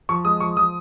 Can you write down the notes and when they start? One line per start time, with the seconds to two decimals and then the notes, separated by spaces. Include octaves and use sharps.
0.09 F3 C#6
0.25 G#3 D#6
0.40 F3 C#6
0.57 F3 D#6